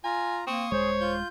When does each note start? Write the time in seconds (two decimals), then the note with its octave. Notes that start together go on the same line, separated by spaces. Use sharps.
0.04 F4 G#5 A#5
0.47 A#3 C4 C6 C#6 D#6
0.71 D#1 G#3 G#4 C5 C#5
1.01 F4 G6